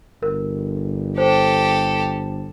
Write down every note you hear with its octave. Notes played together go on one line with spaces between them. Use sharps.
G1 A#4
G4 A4 C5